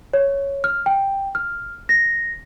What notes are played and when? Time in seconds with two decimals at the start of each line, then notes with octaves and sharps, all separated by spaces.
0.13 C#5
0.64 F6
0.86 G5
1.35 F6
1.89 A#6